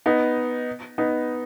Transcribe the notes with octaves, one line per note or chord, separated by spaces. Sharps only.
B3 D#4
B3 D#4